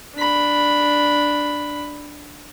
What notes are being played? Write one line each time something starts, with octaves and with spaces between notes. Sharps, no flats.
D4 B5